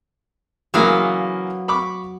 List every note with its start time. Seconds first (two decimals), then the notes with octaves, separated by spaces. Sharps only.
0.74 C#3 E3 F#3 A#3 B3 F5
1.68 B5 C#6 D6